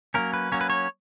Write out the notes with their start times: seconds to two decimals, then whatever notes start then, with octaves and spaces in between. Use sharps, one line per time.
0.14 F#3 A#3 C#4 A#4
0.34 B4
0.52 F#3 A#3 C#4 C#5
0.61 B4
0.70 C#5